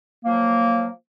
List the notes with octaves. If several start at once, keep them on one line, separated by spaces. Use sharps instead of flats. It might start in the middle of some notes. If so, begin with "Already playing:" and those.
F3 F#3 A#3